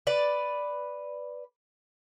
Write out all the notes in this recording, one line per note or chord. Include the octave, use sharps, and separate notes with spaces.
B4 D5